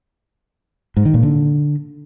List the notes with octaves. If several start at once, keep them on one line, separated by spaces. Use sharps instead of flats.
G#2
D#3
A#2
D3